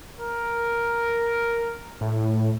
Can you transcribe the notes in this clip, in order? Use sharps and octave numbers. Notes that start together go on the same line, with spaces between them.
A#4
A2